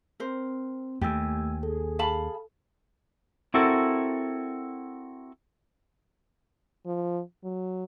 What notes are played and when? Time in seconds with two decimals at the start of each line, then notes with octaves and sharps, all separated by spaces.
0.20 C4 A#4 C5
1.01 D#2 A3 G4 G#5 E6
1.63 G#4 A4
1.99 F5 A5 B5
3.54 C4 E4 F#4 A4 A#4
6.86 F3
7.44 F#3